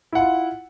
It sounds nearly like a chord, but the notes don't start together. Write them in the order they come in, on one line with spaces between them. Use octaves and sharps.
E4 F#5 F4